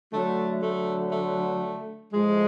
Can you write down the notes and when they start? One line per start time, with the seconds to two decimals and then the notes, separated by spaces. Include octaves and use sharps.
0.13 D3 F#3 A3
0.63 A3
1.12 A3
2.14 A2 F3 G#3